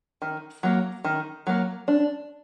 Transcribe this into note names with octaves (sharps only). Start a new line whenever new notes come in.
D#3
F#3 A#3
D#3
F#3 A#3
D4